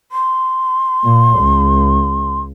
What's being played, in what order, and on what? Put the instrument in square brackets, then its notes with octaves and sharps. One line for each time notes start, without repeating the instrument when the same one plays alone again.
[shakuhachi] C6
[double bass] A#2
C#2